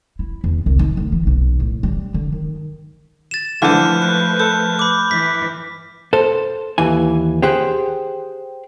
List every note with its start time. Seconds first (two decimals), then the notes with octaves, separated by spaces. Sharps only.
0.19 E4
0.44 E2
0.66 C2
0.79 D#3
0.97 D2
1.12 E3
1.27 B1
1.60 A2
1.83 G3
2.14 D3
2.32 D#3
3.31 A6 E7
3.62 D3 E3 F3 A3 B4 F6 G6
4.02 F#6
4.40 A4 G6
4.79 B5 D6
5.11 E3 B6
6.13 A4 C5
6.78 D#2 E3 G#5
7.42 G4 G#4 C5 F#5 G5